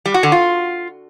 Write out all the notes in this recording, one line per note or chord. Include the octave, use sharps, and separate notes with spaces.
G3
F#4
D3
F4